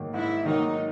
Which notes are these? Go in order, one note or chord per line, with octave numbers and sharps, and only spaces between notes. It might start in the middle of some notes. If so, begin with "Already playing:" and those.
Already playing: G#2 D#3 F#3 A#3
G#2 E4
D#3 F#3 A#3 D#4